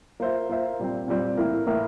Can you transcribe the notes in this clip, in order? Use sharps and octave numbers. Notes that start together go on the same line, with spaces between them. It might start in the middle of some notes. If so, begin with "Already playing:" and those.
A#3 F4 C5 E5
A#3 F4 C5 E5
A#2 G3 C4
A#2 G3 C4
A2 E3 A#3 E4 A#4
A2 E3 A#3 E4 A#4